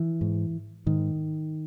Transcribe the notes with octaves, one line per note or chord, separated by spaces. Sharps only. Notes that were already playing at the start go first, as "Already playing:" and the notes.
Already playing: E3
G#2
G#2 D#3